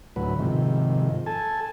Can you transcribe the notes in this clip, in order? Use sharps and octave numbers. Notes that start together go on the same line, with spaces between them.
D2 A2 F#3 B4
G#2 C3 D#3 F3
A4 G#5 A5